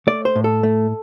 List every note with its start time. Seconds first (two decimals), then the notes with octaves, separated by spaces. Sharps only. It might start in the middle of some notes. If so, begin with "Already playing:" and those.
0.07 A3 D5
0.25 C5
0.35 A2
0.44 A4
0.63 A3